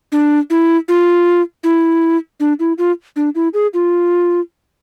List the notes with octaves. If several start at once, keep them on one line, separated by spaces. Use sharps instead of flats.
D4
E4
F4
E4
D4
E4
F4
D4
E4
G#4
F4